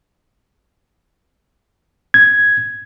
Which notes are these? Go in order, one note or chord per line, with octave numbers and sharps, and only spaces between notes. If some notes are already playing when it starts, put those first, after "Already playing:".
G#6